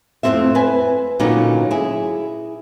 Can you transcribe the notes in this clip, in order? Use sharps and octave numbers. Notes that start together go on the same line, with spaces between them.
F2 A2 C3 A3 C4 E5
B4 G#5
A#2 D3 F#3 B3 C#4 D#4
E4 G#4